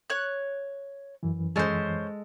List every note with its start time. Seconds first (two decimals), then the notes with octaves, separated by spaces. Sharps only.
0.10 C#5 F#6
1.23 F#2 E3
1.56 G#3 C#4 A4 C5